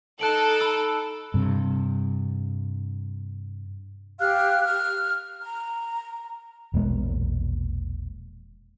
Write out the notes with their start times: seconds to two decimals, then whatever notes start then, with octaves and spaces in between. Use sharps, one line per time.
0.19 D#4 A4 F#6 D7 F#7
0.61 B5 E6
1.34 G2 C3
4.19 G4 F5 F6 F#6
4.64 F6
5.42 A#5
6.74 E1 A#1 G#3 B3